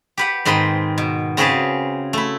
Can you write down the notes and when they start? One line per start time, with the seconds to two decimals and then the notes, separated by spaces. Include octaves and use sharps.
0.17 G4 B4 F#5
0.45 G#2 D#3 C4 B4 B5 C6
0.98 B2
1.37 C#3 C4 F#4 G#4 B4 A5
2.13 A3 E4